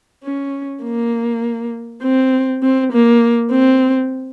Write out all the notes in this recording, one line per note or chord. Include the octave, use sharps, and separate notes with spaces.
C#4
A#3
C4
C4
A#3
C4